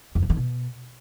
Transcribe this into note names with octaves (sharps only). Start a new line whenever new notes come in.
F2
C#3
D#3
B2